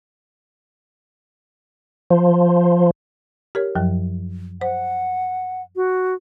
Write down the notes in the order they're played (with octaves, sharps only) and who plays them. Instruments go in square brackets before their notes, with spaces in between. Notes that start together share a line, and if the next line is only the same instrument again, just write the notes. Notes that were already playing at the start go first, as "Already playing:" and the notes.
[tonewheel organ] F3
[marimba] G4 A#4 C#5
F#2 F3 F#3
[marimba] C5 [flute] F#5
[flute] F#4